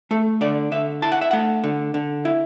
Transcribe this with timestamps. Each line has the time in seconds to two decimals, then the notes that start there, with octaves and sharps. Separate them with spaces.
0.11 A3 A4
0.41 D3 D5
0.72 D3 E5
1.02 E4 A5
1.12 F#5
1.21 E5
1.31 A3 F#5
1.64 D3
1.94 D3
2.25 E4